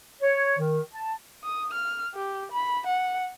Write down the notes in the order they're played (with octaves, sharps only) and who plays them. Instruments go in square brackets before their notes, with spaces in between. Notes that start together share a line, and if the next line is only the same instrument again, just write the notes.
[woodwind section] C#5
D#3
A5
[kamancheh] D#6
F6
G4
B5
F#5